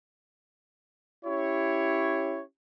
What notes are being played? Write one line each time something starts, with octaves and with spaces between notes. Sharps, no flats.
C#4 E4 G4 C#5